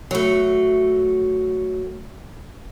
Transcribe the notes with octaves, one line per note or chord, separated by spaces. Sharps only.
F#3 A3